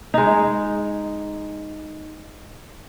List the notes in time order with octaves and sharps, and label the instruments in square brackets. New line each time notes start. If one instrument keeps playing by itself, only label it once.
[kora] G#3 D#4